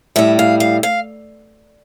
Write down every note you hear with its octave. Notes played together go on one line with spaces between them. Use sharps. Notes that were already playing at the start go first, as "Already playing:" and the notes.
A2 G3 E5
F5
F5
F5